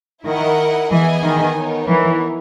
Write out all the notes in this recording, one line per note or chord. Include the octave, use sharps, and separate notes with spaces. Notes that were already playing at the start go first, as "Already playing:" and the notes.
D#3 E4 A#4 D#5 F#5
E3 B3 E4 G#4 D#5 G#5
D#3
B3 D#4 A#4 C#5
E3